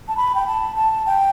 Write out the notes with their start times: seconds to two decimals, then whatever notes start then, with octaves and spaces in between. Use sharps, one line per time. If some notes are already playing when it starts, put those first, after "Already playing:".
0.08 A5
0.17 B5
0.35 G5
0.47 A5
0.76 A5
1.06 G5